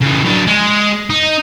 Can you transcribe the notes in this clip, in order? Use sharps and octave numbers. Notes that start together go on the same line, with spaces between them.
C#3 E3
F#3 D4
G#3
D#4